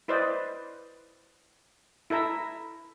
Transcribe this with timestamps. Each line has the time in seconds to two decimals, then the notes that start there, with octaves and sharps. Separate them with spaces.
0.08 E4 B4 C5 D5 D#5
2.10 E4 A4 E5 A#5